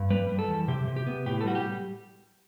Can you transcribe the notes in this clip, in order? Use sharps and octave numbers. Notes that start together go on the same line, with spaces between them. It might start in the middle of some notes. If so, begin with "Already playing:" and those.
Already playing: G2
G3 B4
G3
A4
E2
C3 G4
C3
G4
B3
A2 G4
A4
G3 F#4
G4